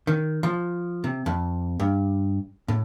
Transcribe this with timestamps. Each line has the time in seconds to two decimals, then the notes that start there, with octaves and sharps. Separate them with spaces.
0.07 D#3
0.43 F3
1.04 C3
1.26 F2
1.80 G2
2.68 A2